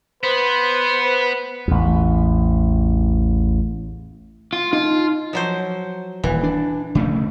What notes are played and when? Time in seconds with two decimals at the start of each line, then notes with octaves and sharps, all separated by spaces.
0.23 B3 B4 C5
1.68 A1 E2
4.53 F4
4.73 D#4 F4
5.33 F3 F#3 C5
6.24 D#1 E3
6.43 D4
6.95 C#3 A3 C#4